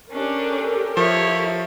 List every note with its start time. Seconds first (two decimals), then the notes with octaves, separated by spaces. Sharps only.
0.11 C#4 D4 G4 A4 A#4
0.97 F3 E4 C#5